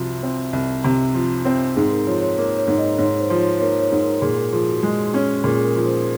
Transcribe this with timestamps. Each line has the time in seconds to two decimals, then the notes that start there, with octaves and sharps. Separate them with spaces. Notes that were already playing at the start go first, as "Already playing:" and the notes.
Already playing: C2 C3 F3 F#4
0.23 C4
0.53 C2
0.84 C3
1.15 F3
1.45 C4
1.76 G#2 G#4
1.91 A#4
2.07 F3 C#5
2.22 C#5
2.38 A#3 C#5
2.58 C#5
2.67 G#2
2.78 D#5
2.98 G#2 C#5
3.20 C5
3.30 F3
3.40 C#5
3.60 A#3 C#5
3.80 C#5
3.92 G#2
4.02 A#4
4.21 A#2 G#4
4.37 A#4
4.52 F3 G#4
4.68 F#4
4.83 G#3
5.14 C#4
5.44 A#2 G#4
5.56 G#4
5.64 A#4
5.76 F3
5.86 C5